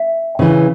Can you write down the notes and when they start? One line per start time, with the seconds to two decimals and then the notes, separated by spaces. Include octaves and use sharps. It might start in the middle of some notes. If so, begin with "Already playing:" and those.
Already playing: E5
0.39 C#3 E3